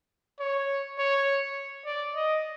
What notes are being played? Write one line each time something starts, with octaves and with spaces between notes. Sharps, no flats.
C#5
C#5
D5
D#5